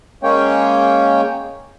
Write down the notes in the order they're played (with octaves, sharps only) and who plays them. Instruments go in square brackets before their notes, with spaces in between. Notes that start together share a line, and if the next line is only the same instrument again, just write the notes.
[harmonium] G#3 A#3 C#4 C#5 G5